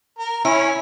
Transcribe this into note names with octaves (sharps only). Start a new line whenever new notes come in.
A#4
C#4 E4